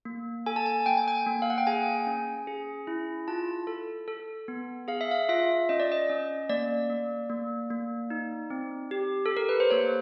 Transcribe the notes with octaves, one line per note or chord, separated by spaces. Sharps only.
A#3
A4 G#5
A5
G#5
A#3 G5
G#5
G5
A#3
F5
F#5
G5
G#4 G#5
C#4
G#4
E4
F4 A5
A4
A4
B3
G#4 F5
E5
F5
F4 E5
C#4 D#5
D5
D#5
C#4
A#3 D5
A#3
A#3
A#3
D#4
C4
G4
A4
G4
A#4
B4
C5
A#3 C#5